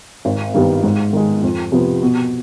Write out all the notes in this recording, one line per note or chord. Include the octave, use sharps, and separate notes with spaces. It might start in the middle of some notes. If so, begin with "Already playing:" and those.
G#1
G2 D#3 G3 B3
G#2
D#3 G#3
F2
C3 F3 B3
B2